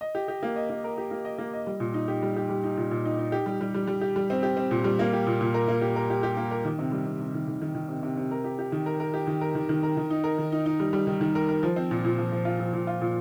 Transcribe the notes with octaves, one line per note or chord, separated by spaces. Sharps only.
D#5
G4
G4
A#3
D#5
A#3
A#4
G4
A#3
D#5
A#3
D#5
G3
A#2
D#4
G4
G3
G4
G3
D#4
A#2
A#2
D#4
D#4
G4
G3
G3
G3
G3
G4
G3
C4
G4
C4
A#2
G3
A#3
G4
A#2
A#2
A#4
A#3
G4
A#4
G4
G4
A#3
A#4
D#3
C3
G3
C3
C3
D#3
D#3
D#3
D#3
C3
C3
C3
A#4
G4
G4
D#3
A#4
A#4
G4
D#3
A#4
D#3
D#3
A#4
D#3
D#4
A#4
D#3
D#4
D#4
G3
G3
D#3
D#3
A#4
A#4
F3
C4
A#2
A#2
F3
F3
F4
F3
A#2
F4
A#2